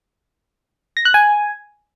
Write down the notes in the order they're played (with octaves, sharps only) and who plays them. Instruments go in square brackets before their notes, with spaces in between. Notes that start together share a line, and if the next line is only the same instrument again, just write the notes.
[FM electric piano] A#6
F#6
G#5